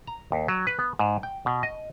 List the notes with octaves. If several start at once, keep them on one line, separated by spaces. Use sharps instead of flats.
A#5
D#2
F#3
B4
B3
G#2
G5
B2
D#5